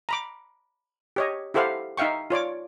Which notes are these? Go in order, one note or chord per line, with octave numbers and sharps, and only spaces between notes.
A#5 B5 D6
G4 C#5 D#5
E4 G4 A4 C5 F5 F#5
D#4 E5 F5 G5 C#6
F4 C#5 D5 D6